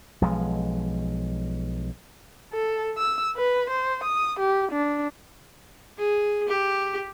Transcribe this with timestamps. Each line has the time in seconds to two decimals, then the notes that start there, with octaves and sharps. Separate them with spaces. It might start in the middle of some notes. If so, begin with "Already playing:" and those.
0.22 B1 F3 G#3
2.53 A4
2.98 E6
3.36 B4
3.70 C5
4.04 D#6
4.39 G4
4.72 D4
5.98 G#4
6.48 G4